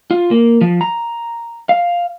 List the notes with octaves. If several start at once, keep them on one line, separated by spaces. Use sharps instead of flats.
F4
A#3
F3
A#5
F5